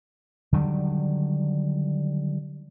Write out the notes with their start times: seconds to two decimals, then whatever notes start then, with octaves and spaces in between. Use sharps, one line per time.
0.53 D3 D#3 F#3 G3